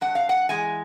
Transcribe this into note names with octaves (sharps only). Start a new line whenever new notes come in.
G2 F#5
F5
F#5
E3 G#3 G#5